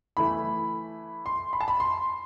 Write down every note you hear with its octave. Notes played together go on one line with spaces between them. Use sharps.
E3 A3 E4 B5
C6
B5
A5
B5
C6